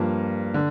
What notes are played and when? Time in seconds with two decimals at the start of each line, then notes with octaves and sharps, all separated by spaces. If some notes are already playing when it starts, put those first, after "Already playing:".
Already playing: G2 F3 A#3
0.54 D3